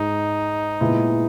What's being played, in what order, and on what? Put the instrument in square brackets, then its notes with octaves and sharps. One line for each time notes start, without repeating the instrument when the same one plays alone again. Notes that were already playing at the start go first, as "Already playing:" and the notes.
Already playing: [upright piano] G#2 G#3 [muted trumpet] D#4
[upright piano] A#2 G#3 B3 E4